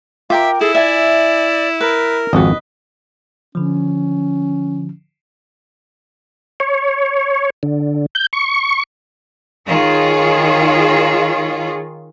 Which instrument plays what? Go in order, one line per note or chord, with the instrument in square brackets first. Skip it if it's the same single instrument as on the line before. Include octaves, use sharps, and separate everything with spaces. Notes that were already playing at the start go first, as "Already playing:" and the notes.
[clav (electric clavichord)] F4 [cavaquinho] A#4 G5 D6 [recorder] E5
[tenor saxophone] E4 [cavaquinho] G#4 [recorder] A4
[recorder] D5 [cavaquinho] E5 G#5
[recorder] A#4 [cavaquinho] B4
[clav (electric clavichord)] G#1 F2 F#4 [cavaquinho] B4 D#5
[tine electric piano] D3 F3 [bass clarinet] C#4
[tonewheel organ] C#5
D3
G6
C#6
[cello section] D#3 F4 G#4 C#5